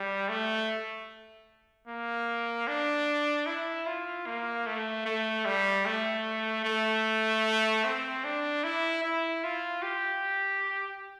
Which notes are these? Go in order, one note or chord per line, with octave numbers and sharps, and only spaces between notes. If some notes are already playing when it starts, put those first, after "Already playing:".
Already playing: G3
A3
A#3
D4
E4
F4
A#3
A3
A3
G3
A3
A3
C4
D4
E4
E4
F4
G4